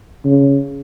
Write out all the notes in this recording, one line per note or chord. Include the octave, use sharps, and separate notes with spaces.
C#3